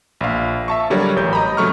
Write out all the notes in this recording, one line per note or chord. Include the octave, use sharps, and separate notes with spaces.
A#1 F5
E5 A5 C#6
D3 F#3 G3 G4 A#4 C#5
A1 G6
D#5 A#5 B5
C#3 F#3 A3 C#6 F6